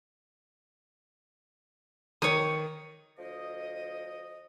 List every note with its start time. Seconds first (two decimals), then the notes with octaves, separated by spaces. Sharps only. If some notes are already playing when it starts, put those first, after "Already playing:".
2.22 D#3 C#5 D#6
3.18 D2 F3 D#5